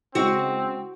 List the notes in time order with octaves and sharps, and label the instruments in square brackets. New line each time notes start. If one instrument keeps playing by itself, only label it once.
[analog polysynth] C#3 G#3 [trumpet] C4 [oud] F#4